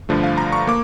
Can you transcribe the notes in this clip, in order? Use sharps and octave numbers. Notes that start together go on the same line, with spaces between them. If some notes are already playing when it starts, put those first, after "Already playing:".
G2 D3 F3 A3
F5
A#5
C#6
A#3 D6